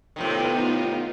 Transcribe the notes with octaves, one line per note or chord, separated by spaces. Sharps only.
A2 C3 D#3 B3 D#4 F4